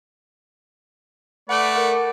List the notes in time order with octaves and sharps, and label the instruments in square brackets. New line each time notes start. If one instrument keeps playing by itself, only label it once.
[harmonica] A3 B4 D5 [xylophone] F#5
[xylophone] A#4 F#5